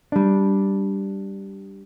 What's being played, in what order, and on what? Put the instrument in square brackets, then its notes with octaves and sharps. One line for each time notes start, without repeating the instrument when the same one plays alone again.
[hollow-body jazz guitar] G3 D4